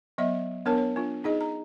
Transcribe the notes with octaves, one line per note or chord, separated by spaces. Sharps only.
F#3 B3 D#5 E5
B3 D4 A#4 C#5 A5
C#5
D4 F4
D#4 G#4 D#5
A#5